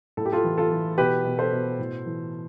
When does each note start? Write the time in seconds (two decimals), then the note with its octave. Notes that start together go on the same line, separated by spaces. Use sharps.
0.17 A2 A4
0.26 G4
0.32 F4 A4
0.44 E3
0.58 F4 A4
0.71 E3
0.98 B2 G4 B4
1.25 B2
1.38 A4 C5
1.52 B2
1.79 A2
2.06 E3